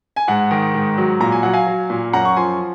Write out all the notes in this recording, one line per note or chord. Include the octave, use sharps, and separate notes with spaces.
G#5
G#2 F#5
D#3
G#2
F#3
A#2 A#5
G#5
F#3 F#5
F5 G#5
F#3
A#2
F#2 F#5 A#5
C#6
F3 G#5 C6